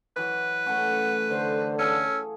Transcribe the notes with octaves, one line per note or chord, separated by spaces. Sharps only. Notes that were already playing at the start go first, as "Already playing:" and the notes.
E3 F#3 B4
A3 C#4 F#5
D3 C5
C#4 G#4 A4 F5 E6